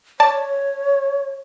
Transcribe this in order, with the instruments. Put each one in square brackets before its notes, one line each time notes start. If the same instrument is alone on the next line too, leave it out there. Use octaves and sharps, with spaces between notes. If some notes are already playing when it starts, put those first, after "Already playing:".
[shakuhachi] C#5 [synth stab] D5 A5